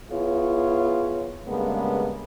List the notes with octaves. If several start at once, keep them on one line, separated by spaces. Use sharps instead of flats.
B3 E4 F4 G#4 C#5
G2 C#3 G#3 A#3 B3